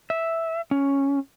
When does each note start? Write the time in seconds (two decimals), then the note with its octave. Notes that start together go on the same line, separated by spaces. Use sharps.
0.10 E5
0.71 C#4